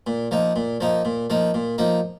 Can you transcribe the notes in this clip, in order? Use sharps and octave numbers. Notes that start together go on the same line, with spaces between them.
A#2
F3 A#3 D#4
A#2
F3 A#3 D#4
A#2
F3 A#3 D#4
A#2
F3 A#3 D#4